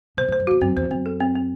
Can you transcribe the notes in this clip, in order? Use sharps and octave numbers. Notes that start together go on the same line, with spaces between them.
B2 C5
A2 C5
F#2
E2 F#4
F#2 C4
E2 C5
F#2 C4
A4
C4
C4